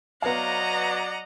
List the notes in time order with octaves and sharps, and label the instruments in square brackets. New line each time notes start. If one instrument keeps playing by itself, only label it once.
[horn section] F#3 D5 [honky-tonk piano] B3 F5 [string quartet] D#5 F#5 A#5